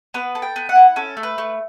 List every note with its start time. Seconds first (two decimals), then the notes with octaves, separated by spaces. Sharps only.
0.14 B3 B4
0.35 A4
0.42 G5
0.56 B3
0.69 F#5
0.75 E4
0.96 C#4 A4
1.17 A3
1.23 B4
1.38 A3